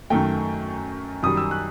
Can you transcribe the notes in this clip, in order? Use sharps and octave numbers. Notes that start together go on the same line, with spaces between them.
F#2 D#3 A3 G5
F#2 D#3 G3 D#6
E6
F#6